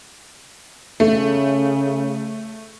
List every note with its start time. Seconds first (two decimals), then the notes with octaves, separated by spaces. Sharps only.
1.00 C#3 A3